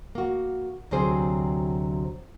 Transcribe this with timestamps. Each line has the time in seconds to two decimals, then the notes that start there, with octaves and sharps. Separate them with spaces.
0.15 A#3 F#4
0.91 D2 C3 F#3 C4 G#4 C5